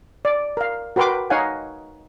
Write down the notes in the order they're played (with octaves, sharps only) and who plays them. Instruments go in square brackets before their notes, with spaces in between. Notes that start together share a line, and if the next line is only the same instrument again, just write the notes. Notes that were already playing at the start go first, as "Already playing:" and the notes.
[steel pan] D5
A#4 F5
F#4 A#4 B4 G5 C6 D6
D#4 C#5 F5 F#5 G#5